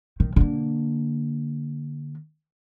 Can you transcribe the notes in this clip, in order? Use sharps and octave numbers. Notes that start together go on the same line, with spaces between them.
D#3
D3 A#3